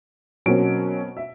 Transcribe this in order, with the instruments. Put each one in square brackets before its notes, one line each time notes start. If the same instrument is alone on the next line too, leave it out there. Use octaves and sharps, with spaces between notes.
[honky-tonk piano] B2 A#3 C4 [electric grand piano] F#3 C#4 D7
[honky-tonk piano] E5